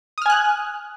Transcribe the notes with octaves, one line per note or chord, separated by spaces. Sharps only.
G#5 D#6 F6 F#6